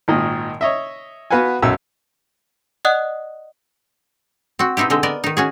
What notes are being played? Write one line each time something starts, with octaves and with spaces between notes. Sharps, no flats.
G#1 A#2 D#3 D#5
C#5 D#5 E5
B3 F#4 B4 F5 F#5 G#5
B1 F#2 E6
D5 D#5 F#5 D#6 F#6
C4 F#4
B2 C4 D#4 E4 G4
D3 G#3 C4 D#5
B3 A#4 D5 D#5
D#3 D#4
C#4 F#4 G#4